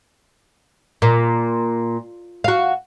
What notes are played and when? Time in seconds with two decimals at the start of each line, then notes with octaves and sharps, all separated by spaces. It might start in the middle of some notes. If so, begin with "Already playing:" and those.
1.02 A#2
2.44 F#4 F5